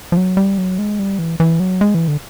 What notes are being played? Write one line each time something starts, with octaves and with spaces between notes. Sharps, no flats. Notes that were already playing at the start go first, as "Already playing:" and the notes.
F3
F#3
G3
F#3
G#3
G3
E3
E3
F#3
G#3
E3
D3